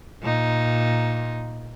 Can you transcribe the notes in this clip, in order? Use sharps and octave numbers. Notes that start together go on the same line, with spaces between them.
A#2 D#4